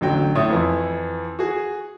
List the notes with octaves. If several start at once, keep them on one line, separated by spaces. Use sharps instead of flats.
A1 D3 F#3 G5
A2 A3 C#5 D#6
F2 E3
F#4 G#4